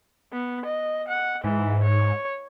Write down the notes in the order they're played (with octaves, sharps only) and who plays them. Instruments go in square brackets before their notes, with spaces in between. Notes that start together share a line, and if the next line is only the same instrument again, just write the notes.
[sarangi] B3
D#5
F#5
[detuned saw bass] G#2 [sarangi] E3
[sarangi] C#5